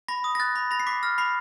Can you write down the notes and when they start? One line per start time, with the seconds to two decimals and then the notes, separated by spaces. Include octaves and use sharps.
0.08 B5 A#6
0.24 D#6
0.35 A#6
0.40 F#6 A6
0.55 B5
0.71 B5 A#6
0.80 C7
0.87 D6 B6
1.03 F6 A#6
1.18 B5 C7